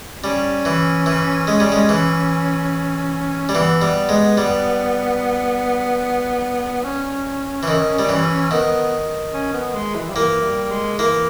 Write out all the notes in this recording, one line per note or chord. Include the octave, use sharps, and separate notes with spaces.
G3 C#4
E3
E3
G#3
G3
G#3
E3
G3
E3 B3
G3
G#3
G3
C#4
E3
D#3
G3
E3
D#3 B3
C#4
B3
G#3
E3
G3
E3 A#3
G3
G#3
E3 A#3